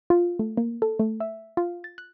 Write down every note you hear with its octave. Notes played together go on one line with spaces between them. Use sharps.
F4
A3
A#3
A4
A3
E5
F4
A6
F#6